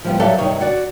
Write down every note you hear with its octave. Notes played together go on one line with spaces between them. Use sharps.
F3 G3 B3
F#3 G3 G4 A4 E5 F5
G2 C3 D#3 D#4 C#5
F#4 D5 F#5